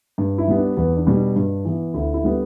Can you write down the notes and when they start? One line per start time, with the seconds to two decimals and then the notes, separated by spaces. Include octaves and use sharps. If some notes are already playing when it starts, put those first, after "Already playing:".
0.18 G2
0.38 E4
0.48 G3 B3
0.57 D4
0.77 E2 B3
0.97 D4
1.07 B2 G3
1.16 D4
1.36 G2
1.65 E3 B3
1.94 D2 E4
2.14 E4
2.24 D3 G3 B3